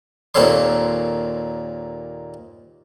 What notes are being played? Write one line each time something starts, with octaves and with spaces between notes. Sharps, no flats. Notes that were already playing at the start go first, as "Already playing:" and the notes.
D#2 A#2 C4 A4 C#5 C6